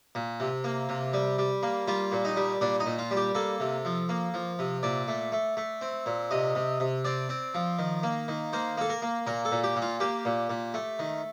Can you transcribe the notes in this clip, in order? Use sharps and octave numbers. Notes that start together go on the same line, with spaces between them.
A#2
C3
A#3
C3
G3
G3
A#3
G3 F4
A#2
D#4
G3
A#2 D4
D#4
A#2
F4
G3
G4
A#3 A4
C3
F3
A#3
F3
C3
A#2 D5
A3
A3
A3
C4
A#2
C3 D#5
C3
C3
C4 D5
C4
F3
D#3
A#3
D#3
A#3 C5
A#3 A4
A#4
A#3
A#2 A#4
A4
A#2
G4
A#2
F4
A#3 G4
A#2
A#2
A3
D#3